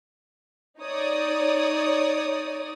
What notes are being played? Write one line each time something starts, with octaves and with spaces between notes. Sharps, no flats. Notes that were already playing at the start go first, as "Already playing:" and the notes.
D#4 C#5 D5 D#6